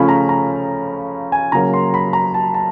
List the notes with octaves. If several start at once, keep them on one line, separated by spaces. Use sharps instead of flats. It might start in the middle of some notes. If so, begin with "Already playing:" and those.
Already playing: C#3 F3 A3 C#4 B5
A#5
A#5
G#5
C#3 F#3 A#3 A#5
C6
B5
A#5
A5
A5